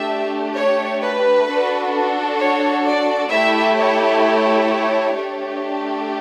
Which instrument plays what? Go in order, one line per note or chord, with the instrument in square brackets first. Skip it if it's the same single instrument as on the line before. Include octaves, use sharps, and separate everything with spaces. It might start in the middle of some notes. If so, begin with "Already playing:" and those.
Already playing: [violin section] A3 D4 G4 E5
C#5
B4
D4 F#4 A4
C#5
D5
A3 E4 G4 E5
C#5
C#5
A3 D4 G4